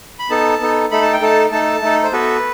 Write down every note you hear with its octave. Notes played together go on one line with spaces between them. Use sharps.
B5
B3 D#4 A4 A5
B3 D#4 A4
A3 D#4 A4 B5
A5
G5
A3 D#4 A4 A5
A3 D#4 A4 A5
A3 D#4 A4
C5
B3 F#4 A4 B4